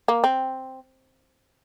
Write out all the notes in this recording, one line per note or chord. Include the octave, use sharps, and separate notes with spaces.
A#3
C4